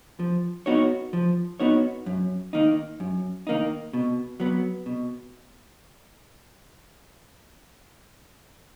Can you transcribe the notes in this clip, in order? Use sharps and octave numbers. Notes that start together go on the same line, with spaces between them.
F3
B3 D#4 F#4 C#5
F3
B3 D#4 F#4 C#5
F#2
D#3 A#3 D#4
F#2
D#3 A#3 D#4
B2
F#3 B3
B2